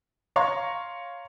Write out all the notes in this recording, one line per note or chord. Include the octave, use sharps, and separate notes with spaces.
C#5 F5 A#5 C6 C#6